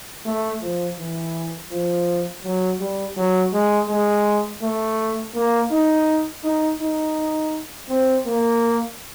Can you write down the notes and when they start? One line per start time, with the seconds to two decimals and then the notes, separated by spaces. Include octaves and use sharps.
0.25 A3
0.61 F3
0.98 E3
1.71 F3
2.44 F#3
2.80 G3
3.16 F#3
3.53 G#3
3.89 G#3
4.62 A3
5.35 A#3
5.71 D#4
6.44 D#4
6.80 D#4
7.89 C4
8.26 A#3